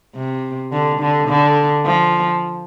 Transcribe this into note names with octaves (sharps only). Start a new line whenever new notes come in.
C3
D3
D3
D3
F3